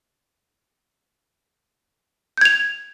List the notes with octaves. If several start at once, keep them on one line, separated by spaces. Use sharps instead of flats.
G6 G#6 F7